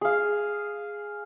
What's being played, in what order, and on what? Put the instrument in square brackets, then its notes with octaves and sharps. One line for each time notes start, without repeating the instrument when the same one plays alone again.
[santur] G#4 F5